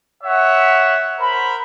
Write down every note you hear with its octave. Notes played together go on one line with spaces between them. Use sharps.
C#5 E5 F#5
A#4 C5 B5